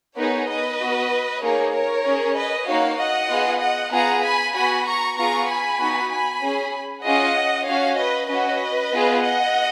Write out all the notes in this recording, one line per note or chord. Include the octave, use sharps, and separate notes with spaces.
B3 D#4 G#4 A#4 C#5
B4 D#5
B3 F#4
A#3 D#4 G#4 A#4 C#5
A#4 C#5
C#4 G#4
B4 D#5
A#3 D#4 F#4 C#5 F5
D#5 F#5
B3 F4 G#4
D#5 F#5
B3 F4 G#4 F#5 A#5
G#5 B5
B3 F#4 G#5 B5
A#5 C#6
B3 F4 G#4 A#5 C#6
G#5 B5
B3 D#4 F#4
G#5 B5
C#4 G#4
C#4 F4 G#4 D#5 F#5
C#4 F#4 C#5 F5
B4 D#5
C#4 F#4 B4 D#5
B3 F4 G#4
D#5 F#5